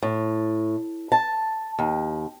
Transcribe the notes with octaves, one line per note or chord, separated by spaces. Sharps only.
A2
A5
D#2